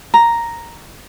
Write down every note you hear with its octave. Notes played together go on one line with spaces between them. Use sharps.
A#5